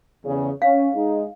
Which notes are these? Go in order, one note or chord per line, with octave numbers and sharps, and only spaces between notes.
E2 C#3
C#4 F5
G#3 D#4